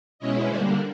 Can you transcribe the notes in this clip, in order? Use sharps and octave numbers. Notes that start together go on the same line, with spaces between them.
B2 G#3 C#4 E4 C#5 D#5
D3 G3 A#3 D4 C5 D5